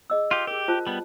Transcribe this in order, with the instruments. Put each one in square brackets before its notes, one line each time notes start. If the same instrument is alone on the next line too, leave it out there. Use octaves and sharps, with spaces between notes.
[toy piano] G#4 D#5 E6
[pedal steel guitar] F4 G4
[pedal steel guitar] G4 [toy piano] G#4 A#4
[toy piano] F4 C5 A5
[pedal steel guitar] G3 B3